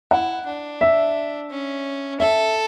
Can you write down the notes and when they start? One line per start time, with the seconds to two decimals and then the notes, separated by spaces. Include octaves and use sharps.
0.11 E4 F#5
0.46 D4
0.81 E5
1.50 C#4
2.20 A4 E5